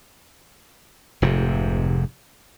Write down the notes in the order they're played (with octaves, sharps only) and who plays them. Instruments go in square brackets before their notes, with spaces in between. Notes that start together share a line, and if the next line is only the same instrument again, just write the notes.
[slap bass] F1 G#2 C3